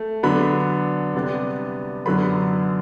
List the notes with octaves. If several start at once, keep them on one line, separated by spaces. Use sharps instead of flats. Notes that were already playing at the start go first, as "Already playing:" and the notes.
Already playing: A3
D3 F#3 B3 D4 B5
C3 G3 B3 D4
F#2 D3 F#3 B3 B5